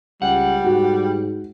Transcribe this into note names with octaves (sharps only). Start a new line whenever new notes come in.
C#2 G3 F#5
G#2 F#4